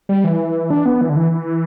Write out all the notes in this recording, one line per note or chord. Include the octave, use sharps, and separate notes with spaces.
G3
E3
D4
B3
E3
D3
E3